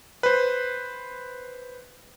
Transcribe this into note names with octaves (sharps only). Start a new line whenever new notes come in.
B4 C5